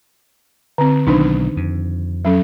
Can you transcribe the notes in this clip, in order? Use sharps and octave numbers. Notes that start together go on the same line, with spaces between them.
D3 C4
B1 D#3 D4 D#4
F2
F#3 C#4 A4